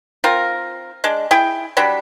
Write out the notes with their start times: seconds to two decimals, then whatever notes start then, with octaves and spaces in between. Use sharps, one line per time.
0.24 C4 F4 A#4
1.04 G#3 D4
1.31 E4 G#4 G5
1.77 F#3 G3 D4 B5